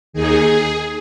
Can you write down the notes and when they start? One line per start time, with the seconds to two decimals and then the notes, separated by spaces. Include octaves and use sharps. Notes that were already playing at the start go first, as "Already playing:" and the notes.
0.13 D#2 D#3 G#4